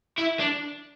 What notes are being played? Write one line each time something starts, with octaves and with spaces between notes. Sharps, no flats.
E4
D4